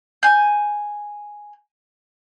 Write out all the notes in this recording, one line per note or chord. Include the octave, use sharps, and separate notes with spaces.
G#5 G6